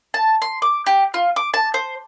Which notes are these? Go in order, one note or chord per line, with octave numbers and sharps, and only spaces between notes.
A5
C6
D6
G4
F4
D6
A5
C5